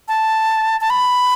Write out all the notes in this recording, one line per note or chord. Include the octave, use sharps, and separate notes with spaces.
A5
A5
B5